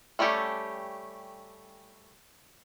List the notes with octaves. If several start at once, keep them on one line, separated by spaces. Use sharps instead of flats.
G3 A3 C#4 G4 A4